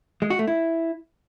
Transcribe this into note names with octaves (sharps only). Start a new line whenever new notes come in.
G#3
F#4
A3
E4